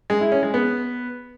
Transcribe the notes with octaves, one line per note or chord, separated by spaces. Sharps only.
G#3
E4
C#4
G#3
B3